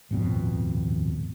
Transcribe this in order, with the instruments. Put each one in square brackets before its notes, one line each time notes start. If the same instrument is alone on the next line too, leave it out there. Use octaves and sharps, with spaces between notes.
[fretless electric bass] D#1 G#1 F2 B2